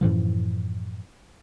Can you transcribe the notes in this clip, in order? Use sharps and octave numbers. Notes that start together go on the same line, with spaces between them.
F#2 A2 E3 F3